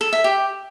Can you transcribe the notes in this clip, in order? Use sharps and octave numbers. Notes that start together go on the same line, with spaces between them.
A4
E5
G4